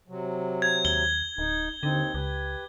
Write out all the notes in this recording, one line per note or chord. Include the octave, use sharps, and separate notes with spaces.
C3 F#3
G#6
D#2 G7
D1 D#4
D#2 D3 C4 D#4
C#2 G4 B4